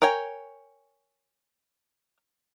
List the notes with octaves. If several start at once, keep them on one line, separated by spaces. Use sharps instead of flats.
A#4 C#5 G5 G#5